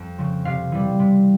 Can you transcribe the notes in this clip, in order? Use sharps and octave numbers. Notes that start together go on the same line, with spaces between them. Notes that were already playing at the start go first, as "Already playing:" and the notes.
Already playing: F2
C#3 F3
C3 F5
E3 G3
C3